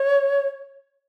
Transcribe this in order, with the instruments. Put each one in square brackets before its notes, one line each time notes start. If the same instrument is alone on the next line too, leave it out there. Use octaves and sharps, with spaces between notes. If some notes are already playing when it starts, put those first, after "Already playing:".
Already playing: [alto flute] C#5